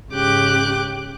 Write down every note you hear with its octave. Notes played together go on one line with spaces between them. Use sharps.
G#2 C#3 G4 G5 D6 F#6